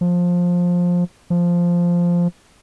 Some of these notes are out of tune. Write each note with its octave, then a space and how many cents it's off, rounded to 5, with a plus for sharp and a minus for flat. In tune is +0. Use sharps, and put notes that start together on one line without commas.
F3 +15
F3 -5